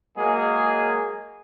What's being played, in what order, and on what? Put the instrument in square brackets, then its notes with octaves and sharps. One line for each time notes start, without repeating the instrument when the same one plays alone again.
[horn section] F#3 G#3 A#3 G#4